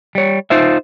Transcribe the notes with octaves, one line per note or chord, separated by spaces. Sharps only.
G3 C#5
D#4 F4 C5 E5